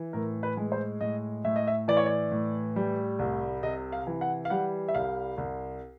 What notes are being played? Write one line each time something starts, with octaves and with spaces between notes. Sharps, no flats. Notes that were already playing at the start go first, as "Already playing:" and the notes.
Already playing: E3
A2 A#4
B4
G#3
C5
A2 D#5
A2 E5
D#5
E5
E3 D5
C#5
D5
A2
G3
C2
C3 D#5
F5
E3
F#5
F5
G3 F#5
E5
C2 F5
C2